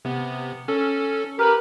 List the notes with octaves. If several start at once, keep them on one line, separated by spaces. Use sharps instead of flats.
C3 B3
C#4 A4
G4 A#4 B4 B5